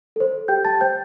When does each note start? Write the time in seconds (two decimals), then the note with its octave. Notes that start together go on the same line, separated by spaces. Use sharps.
0.16 A4 C5
0.48 G4 G5 G6
0.65 A5 A6
0.81 C5 G5 G6